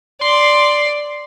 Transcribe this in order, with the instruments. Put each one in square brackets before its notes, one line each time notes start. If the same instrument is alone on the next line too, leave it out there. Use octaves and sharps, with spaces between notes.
[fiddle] D5 [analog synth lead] C6